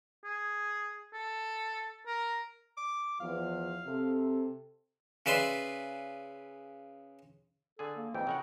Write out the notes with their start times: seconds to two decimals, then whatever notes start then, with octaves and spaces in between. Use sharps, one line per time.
0.24 G#4
1.14 A4
2.07 A#4
2.77 D6
3.20 E2 F3 F5
3.87 C3 A4
5.26 C#3 B4 D5 E5 B5 C6
7.79 D3 G#4 A4
7.96 A#3
8.14 F2 G#2 E3 G5
8.27 C#3 A#4 F#5